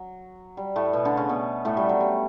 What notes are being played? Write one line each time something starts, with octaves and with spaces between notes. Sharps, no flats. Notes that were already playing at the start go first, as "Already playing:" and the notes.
Already playing: F#3
G3
A2 A3
B2 B3
D3 D4
C#3 C#4
B2 B3
A2 A3
G3
F#3
G3